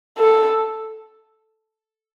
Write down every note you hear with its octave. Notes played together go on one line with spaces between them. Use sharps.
A4